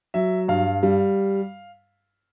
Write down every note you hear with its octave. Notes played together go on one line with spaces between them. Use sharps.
F#3 E5
G2 F5
G3